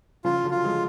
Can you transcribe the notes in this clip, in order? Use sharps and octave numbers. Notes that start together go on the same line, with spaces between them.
C#3 F3 F4
D3 F#3
F4
F3 G#3